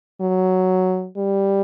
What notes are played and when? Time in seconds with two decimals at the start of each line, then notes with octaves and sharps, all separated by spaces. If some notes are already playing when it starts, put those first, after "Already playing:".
0.21 F#3
1.17 G3